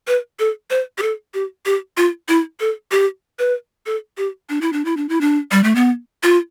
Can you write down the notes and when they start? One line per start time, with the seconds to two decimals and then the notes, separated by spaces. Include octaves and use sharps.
0.07 B4
0.39 A4
0.70 C5
0.98 G4
1.02 A4
1.34 G4
1.66 G4
1.97 F4
2.28 E4
2.60 A4
2.91 G4
3.39 B4
3.86 A4
4.18 G4
4.49 D4
4.61 E4
4.73 D4
4.85 E4
4.97 D4
5.09 E4
5.21 D4
5.51 G3
5.64 A3
5.75 B3
6.23 F4